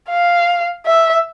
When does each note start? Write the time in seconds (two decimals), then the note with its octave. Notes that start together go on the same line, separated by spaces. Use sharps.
0.10 F5
0.86 E5